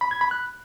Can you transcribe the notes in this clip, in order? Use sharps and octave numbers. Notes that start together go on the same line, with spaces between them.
B5
G#6
B5
F#6